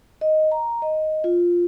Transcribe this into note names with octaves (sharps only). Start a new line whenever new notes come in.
D#5
A#5
D#5
F4